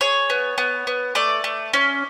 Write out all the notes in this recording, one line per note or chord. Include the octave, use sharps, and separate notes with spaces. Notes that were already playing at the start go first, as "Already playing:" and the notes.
G#4 C#5
B3
B3
B3
A3 D5
A3
C#4